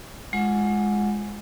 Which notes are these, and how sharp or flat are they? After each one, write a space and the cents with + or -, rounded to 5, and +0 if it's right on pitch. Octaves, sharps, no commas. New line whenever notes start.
G#3 +0 F4 +0 F#5 -15